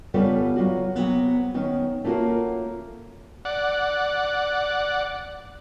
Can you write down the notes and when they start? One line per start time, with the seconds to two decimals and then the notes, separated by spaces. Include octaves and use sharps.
0.14 C#3 G3 B3 F4 A4 B4
0.56 F#3 F4 F#4
0.95 C3 F#3 B3
1.54 D#3 B3 C#4
2.04 A3 A#3 C#4 F4 F#4 A#4
3.45 D5 F#5